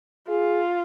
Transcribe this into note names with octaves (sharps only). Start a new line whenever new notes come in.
F4 G#4